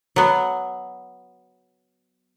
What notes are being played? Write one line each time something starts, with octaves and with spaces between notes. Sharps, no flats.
F#3 B3